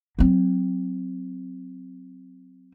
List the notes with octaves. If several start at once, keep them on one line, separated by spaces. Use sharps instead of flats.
F#3 C4